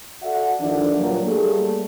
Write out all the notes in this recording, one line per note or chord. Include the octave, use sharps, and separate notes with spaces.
F#4 A4 D5 E5 F#5
D2 G2 D3 D#3 F3 D4
G2 A#2 F#3
G3 A3 A#3 G#4